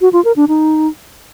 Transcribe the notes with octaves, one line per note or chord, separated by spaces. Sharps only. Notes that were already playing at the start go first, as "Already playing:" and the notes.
F#4
F4
A#4
D4
D#4